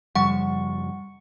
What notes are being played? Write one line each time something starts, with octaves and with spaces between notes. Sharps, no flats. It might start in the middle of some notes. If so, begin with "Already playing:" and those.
F#2 C#3 F3 G3 F#5 C#6 A6